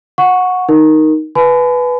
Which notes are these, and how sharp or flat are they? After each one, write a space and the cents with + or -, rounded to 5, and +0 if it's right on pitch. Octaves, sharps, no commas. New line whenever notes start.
F#5 -20 C#6 +0
D#4 +0 A#4 +0
B4 +0 G#5 +40 B5 +35